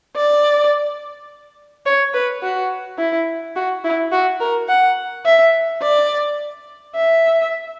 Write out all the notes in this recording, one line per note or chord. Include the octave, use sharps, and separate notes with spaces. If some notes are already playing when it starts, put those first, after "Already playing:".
D5
C#5
B4
F#4
E4
F#4
E4
F#4
A#4
F#5
E5
D5
E5